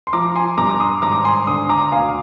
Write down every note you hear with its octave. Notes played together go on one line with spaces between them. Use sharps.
C6
F3 A#5 D6
G#5 C6
G2 A#5 D6
D6
C6 D#6
G#1 A#5 D6
G#5 C6
D3 C6 D#6
A#5 D6
D2 F5 G#5